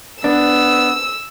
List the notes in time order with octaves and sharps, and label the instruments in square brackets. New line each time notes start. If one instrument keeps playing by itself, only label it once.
[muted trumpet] B3 [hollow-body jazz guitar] D4 [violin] E6